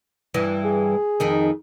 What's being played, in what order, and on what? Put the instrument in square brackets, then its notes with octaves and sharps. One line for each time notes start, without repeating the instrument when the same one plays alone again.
[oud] G2 E3
[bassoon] G#4
[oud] F2 D#3 D#4